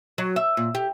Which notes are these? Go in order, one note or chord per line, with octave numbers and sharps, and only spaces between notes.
F#3
E5
A#2
G4